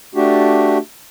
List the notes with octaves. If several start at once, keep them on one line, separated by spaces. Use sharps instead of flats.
A3 D4 F#4 G4